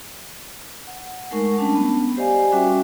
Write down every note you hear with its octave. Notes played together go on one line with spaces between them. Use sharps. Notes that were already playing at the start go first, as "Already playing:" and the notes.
F#5
G#3 A3 D#4 A#4 F#5 C#6
G3 C#4 D4 A5
B3
G4 C5 D5 D#5 F5 G#5
G3 C#4 F#4 E5 G5 D6